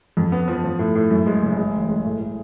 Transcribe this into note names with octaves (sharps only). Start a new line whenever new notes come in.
F2
B3
F3
F3
A2
A2
F#2
G#3
F#1
G#3
A1
G#3
A2
A2